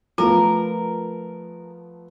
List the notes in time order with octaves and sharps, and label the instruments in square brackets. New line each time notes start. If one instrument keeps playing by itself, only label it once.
[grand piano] F3 A3 B3 [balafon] F4 [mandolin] A#4